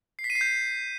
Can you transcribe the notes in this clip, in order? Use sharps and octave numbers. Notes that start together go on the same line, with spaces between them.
C7
B6
D#7
C7
G6